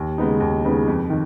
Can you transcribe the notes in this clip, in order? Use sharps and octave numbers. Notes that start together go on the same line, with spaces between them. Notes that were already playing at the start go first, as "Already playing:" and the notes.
Already playing: D#2
C#3 G#3 B3 D#4
D#2
C#3 G#3 B3 D#4
F2
D#3